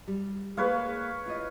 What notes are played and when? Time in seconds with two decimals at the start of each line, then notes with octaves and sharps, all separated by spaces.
0.08 G3
0.57 G#3 A#3 G#4 B4 C#5 F5
1.26 E4 F4 D#5